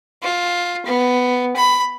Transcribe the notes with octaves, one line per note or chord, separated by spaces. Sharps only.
F4
B3
B5